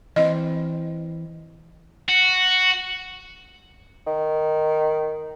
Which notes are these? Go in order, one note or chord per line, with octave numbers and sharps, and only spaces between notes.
E3 C4 D#5
F#4
D#3